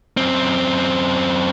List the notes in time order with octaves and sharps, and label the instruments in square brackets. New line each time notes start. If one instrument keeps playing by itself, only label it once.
[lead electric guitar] F#2 C4